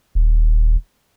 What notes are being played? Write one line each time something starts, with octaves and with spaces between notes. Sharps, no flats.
D#1